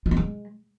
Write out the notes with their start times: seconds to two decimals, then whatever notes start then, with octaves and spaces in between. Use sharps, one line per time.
0.06 F4
0.11 B3
0.17 G#3